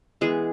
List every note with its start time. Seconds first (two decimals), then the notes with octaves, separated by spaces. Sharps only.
0.21 E3 G#3 B3 G#4